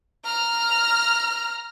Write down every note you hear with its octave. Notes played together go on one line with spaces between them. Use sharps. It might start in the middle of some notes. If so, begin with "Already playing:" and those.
A#5 F6